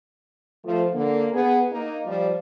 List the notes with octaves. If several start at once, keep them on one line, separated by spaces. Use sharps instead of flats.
F3 A3
D3 A#3
B3 G#4
A#3 D#4
F3 G3